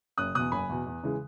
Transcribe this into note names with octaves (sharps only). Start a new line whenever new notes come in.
F#1 D#6 F#6
E2 B2 D#6 F#6
F#1 G#5 B5
E2 B2
E2
C#3 E3 G#3